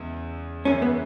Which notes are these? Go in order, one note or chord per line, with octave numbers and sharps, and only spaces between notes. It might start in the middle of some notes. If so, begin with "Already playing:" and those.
Already playing: E2 C#3 E3 G#3
F#2 C#3 E3 G#3 C#4
B3